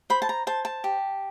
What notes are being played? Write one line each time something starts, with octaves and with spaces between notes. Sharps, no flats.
C5 B5
A5
A#5
C5 A5
A5
G4